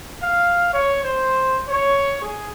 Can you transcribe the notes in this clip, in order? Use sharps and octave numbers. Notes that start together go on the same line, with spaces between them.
F5
C#5
C5
C#5
G#4